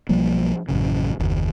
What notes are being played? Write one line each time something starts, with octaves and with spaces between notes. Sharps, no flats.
B1 F3 G3 A#3
A1 F#2 C#3
F#1 D#2